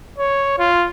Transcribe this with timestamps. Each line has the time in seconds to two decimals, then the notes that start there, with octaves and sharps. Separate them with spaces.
0.18 C#5
0.59 F4